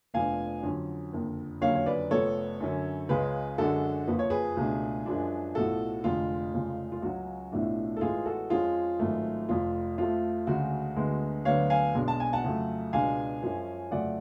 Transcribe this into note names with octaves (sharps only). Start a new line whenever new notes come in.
F1 F2 F3 B3 D4 F5 G#5
F2 D3 F#3 C#4
F#1 F2 D3
F#1 F2 D3 F#3 C#4 C#5 F5
C#5
B4 D5
F1 F2 F3 B3 A4 C#5
F#2 D3 F#3 C#4
C#2 C#3 G#3 C#4 G#4 B4
F#2 D3 G#3 D4 F#4 A4
F#1 F2 F3 B4
C#5
G#4 B4
C#2 B2 A3 D4
F#2 F3 G#3 D4
B1 A2 F3 F#4 A4
F1 F2 D3 G#3 F4
F1 F2 C#3 G#3
F4
C#2 C#3 F#3 C#4 F#4
B1 A2 F3 A3 D4
A4
A1 A2 G#3 B3 F4 G#4
F#4 A4
F2 F3 G#3 C#4 F4 G#4
G#1 G#2 F#3 A3
F1 F2 F3 F4
F2 F3 A3 F4
D2 C#3 G#3 F#4
D2 D3 G#3 B3
D2 D3 F#3 B3 D4 C#5 F5
F5 G#5
B1 B2 G#3 D4
A5
G#5
F#5 A5
F2 C#3 F#3 A3
C#2 B2 G#3 B3 D4 F5 G#5
F#2 F3 G#3 C#4
F2 C#3 F#3 A3 D5 F#5